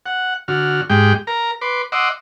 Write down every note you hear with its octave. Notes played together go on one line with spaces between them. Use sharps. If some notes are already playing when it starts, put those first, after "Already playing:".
F#5
D3 F#4 F6
G#2 G#3 G4 G5
A#4 A#5
B4 C6 D6
D#5 F#5 C6 D6 E6